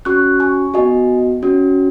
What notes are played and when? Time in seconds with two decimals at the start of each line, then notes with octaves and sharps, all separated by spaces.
0.05 C#4 F#4 C#6 F#6
0.40 G#5 C#6
0.74 B3 F#4 D#5 G#5
1.43 C#4 F#4